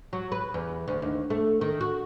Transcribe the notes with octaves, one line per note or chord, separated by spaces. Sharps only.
F#3
B4
E2
D2
D#2
A3
D#3
F#4